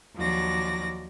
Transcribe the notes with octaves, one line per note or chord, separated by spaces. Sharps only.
D#2 F3 F#3 D5 A#6